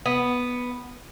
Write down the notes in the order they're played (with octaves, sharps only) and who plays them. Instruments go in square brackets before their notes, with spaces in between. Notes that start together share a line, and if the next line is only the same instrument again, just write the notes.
[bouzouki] B3